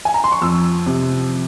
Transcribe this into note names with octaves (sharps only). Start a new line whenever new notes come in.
G#5
A#5
C6
C#6
F2 E6
C3